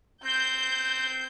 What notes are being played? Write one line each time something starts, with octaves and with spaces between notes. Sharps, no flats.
C4 G6